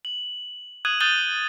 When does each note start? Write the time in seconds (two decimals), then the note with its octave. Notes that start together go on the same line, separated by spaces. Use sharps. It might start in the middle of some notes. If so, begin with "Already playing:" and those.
0.05 F#7
0.85 D#6 F#6 G#6 D#7 F#7
1.00 D#6 F#6 G6 A6 D#7 G7